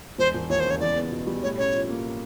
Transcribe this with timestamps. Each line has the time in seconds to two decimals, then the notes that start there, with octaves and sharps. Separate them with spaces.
0.18 E1 C5
0.34 E1
0.49 D#2 C#5
0.60 C#3 C5
0.71 C#5
0.80 E2 D5
0.96 B3
1.12 B2
1.27 G3
1.43 A2 C#5
1.58 C#4 C#5
1.73 F3
1.89 A#3